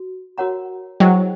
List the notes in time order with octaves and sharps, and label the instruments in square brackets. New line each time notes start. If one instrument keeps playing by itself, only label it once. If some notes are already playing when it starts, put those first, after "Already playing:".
Already playing: [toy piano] F#4
F#4 A#4 C#5 F#5 A#5
[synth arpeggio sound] F#3 [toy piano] E4 G#4 C5 D#5 G5